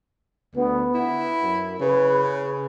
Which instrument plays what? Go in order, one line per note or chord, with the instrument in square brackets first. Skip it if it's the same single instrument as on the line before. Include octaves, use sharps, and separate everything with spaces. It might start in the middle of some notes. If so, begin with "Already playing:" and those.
[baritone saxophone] D2 [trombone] B3
[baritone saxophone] E4
[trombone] F#2
[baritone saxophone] C#3 [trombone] B4